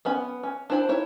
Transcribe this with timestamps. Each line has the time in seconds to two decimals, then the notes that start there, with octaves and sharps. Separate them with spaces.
0.05 B3 C#4 B5
0.43 C#4
0.70 D4 E4 C5 A#5 B5
0.89 D#4 E4 C#5